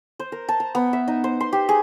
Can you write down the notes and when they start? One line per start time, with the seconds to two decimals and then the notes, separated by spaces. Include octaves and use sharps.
0.19 C5
0.32 A#4
0.49 A5
0.60 A#5
0.75 B3
0.93 E5
1.08 D#4
1.24 C5
1.41 C6
1.52 G4
1.69 G#4